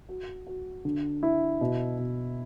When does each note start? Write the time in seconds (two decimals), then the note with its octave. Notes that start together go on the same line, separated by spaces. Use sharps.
0.09 F#4
0.47 F#4
0.85 D3
1.23 E4
1.61 B2
1.98 B2